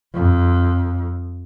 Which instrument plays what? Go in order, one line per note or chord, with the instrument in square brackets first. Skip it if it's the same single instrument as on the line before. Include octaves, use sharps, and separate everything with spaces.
[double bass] F2